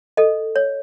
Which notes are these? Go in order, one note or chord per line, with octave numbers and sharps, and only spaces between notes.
A4 D#5
C#5